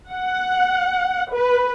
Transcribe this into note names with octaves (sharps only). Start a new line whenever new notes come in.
F#5
B4